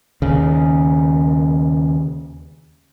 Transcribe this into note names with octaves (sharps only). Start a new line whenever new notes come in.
D#2 C#3